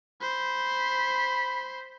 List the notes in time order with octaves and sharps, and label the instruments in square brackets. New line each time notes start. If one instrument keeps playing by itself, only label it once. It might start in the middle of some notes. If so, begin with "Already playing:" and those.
[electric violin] C5 [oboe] B5